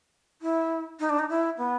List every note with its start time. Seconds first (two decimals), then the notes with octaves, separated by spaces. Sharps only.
0.42 E4
1.00 D#4
1.10 D4
1.19 D#4
1.29 E4
1.58 B3